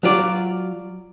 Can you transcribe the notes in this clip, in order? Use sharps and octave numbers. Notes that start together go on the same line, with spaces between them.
F#3 F4 D5